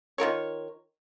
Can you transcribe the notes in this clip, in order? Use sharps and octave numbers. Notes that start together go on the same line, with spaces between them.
D#3 F4 A#4 C#5